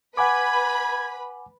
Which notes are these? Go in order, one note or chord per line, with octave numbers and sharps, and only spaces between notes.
B4 F#5 G#5 B5 D6 G#6